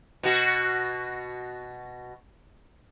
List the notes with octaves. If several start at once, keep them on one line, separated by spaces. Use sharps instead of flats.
B2 F#4